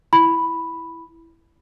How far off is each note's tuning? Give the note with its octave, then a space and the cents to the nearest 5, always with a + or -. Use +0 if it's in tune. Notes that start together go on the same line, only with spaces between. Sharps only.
E4 +5 B5 +0